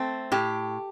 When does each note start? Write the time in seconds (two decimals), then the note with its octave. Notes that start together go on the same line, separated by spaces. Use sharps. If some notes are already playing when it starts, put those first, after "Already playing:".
Already playing: A3 C4
0.32 A2 G4